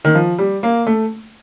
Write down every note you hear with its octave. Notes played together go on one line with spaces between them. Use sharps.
D#3
F3
G3
A#3
A3